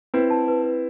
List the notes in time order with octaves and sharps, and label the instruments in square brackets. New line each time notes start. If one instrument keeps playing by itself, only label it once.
[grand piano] C4 E4 [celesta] B4
[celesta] A5
B4
B4